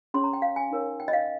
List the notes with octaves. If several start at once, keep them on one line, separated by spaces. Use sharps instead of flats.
C#4 G#4 C#5 C6
A#5
G5
F5
G#5
D#4 A#4 C#5
G5
D#5
F5